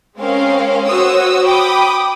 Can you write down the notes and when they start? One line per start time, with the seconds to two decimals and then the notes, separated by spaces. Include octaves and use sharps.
0.17 G#3 C4 C#4 A#4 F5
0.86 F#4 C5 C#5 D#6 E6
1.43 G5 B5 D6 D#6